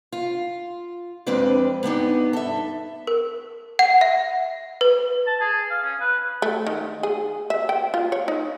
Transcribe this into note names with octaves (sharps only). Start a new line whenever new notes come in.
F4
F2 G#3 C4 D4 B4 D5
G2 B3 D4 D#4
A4 E5
A#4
F#5
E5
B4
A5
G#4
F5
C#4
B4
A3
D#3
G#4
E5
G5
F4
C#5
D#4